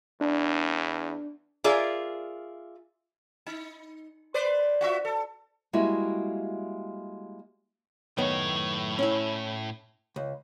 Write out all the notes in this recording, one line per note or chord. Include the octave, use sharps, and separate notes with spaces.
E2 D4
F4 G#4 A#4 D5 E5
D#4
B4 C5 D5
F4 F#4 E5
A4
G3 G#3 A#3 E4 F#4
F#2 A2 D#3 B3 C#5
C#4 E4
C#2